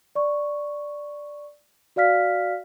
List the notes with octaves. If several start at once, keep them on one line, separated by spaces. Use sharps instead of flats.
D5 C#6
F#4 D5 F5 F6 B6